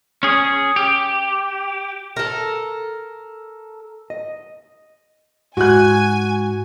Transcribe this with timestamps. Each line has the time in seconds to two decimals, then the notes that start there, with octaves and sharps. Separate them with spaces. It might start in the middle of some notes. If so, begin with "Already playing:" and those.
0.23 C#4 G#4
0.76 G4
2.16 A4 A#4
4.10 D#5
5.57 G#2 F#4 G#5 F#6